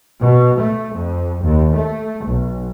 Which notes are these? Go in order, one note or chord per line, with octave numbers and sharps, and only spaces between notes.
B2
A3
F2
D#2
A3
B1